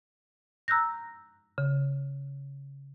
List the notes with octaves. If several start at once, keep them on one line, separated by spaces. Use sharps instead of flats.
A#5 E6 F#6 G6 A#6
C#3